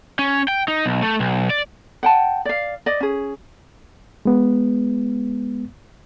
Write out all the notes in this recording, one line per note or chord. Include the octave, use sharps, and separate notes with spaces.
C#4
G5
D#4
B1
A3
B1
D5
F#5 G5 A5
D5 F5
D5 D#5
C#4 G#4
G#3 B3